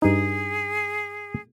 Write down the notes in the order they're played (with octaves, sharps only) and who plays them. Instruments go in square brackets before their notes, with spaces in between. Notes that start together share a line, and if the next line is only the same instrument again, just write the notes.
[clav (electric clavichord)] G2 D#4 [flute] G#4